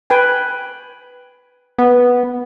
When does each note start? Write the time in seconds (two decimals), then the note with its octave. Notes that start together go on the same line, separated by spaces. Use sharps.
0.10 B4 G5 G#5
1.78 B3